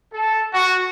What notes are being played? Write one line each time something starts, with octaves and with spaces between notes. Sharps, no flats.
A4
F#4